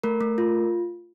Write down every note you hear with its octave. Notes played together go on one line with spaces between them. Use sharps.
A3 A#4
A3
F4